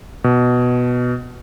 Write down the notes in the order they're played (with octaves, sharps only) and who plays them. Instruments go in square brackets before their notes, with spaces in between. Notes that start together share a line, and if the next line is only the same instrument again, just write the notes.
[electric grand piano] B2